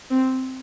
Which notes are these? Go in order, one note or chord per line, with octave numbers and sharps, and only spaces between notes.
C4